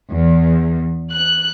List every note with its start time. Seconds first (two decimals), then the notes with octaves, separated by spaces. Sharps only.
0.10 E2
1.11 F#6